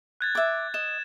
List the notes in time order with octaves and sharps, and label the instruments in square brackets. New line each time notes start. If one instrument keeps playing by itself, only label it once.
[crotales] F#6 G#6 A6
[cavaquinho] E5 D6
[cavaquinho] D#5 [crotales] E7